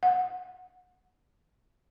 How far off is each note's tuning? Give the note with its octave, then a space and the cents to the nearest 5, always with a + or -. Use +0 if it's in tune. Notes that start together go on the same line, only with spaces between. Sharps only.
F#5 -20